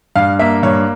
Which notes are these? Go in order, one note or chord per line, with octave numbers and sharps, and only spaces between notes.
G2 F5
A#3 E5
G2 C#5